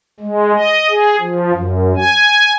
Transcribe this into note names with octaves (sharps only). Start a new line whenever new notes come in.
G#3
D#5
G#4
F3
F#2
G#5